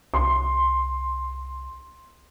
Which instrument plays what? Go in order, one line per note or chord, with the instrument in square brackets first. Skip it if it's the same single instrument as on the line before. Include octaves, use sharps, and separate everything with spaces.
[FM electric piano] C2 [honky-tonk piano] C6